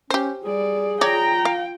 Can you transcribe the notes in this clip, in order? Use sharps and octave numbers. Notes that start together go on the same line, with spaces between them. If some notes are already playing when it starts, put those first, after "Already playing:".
C#4 G4 C5
G3 G#4 D5
F4 C#5 D5 G5 A#5
F5